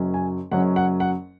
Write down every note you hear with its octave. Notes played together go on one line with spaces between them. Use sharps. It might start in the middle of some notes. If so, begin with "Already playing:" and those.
Already playing: F#1 F#2 F#3 C#4
G#5
F#1 F#2 F#3 C#4 F#5
F#5
F#5